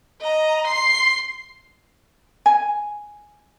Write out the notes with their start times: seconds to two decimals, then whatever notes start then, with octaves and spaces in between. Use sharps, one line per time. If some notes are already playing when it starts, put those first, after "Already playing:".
0.21 D#5 A#5
0.67 C6 C7
2.46 G#5